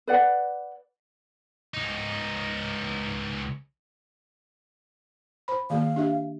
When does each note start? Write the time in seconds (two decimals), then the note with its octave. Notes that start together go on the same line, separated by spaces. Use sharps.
0.07 B4 D5 F#5
1.74 C#2 D#4
5.48 C5 B5
5.70 D#3 A#3 G#4 F5
5.96 D4 G4 E5